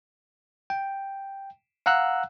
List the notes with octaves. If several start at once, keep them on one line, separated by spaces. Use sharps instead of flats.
G5
F5 F#5 A#5 E6 F#6